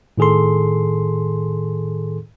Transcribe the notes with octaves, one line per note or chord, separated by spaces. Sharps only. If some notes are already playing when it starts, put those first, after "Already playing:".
A2 D#3 G#4 A4 C6